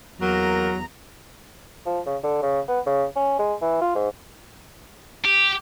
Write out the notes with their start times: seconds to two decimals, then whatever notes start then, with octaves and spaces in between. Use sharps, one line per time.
0.21 E2 F#3 A#3 A#4 A#5 A#6
1.86 F3
2.06 C#3
2.23 D3
2.42 C#3
2.68 B3
2.86 C#3
3.16 C#4
3.39 G#3
3.61 E3
3.81 F4
3.95 G#2
5.25 G4